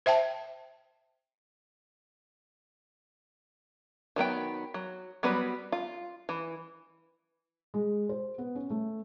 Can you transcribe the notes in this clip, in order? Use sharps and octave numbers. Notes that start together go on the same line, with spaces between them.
C5 E5 G5 A5
D#3 F#3 B3 G5
F#3
F#3 G3 B3 F#4 B4
F4
E3
G#3
C5
B3
C#4
A3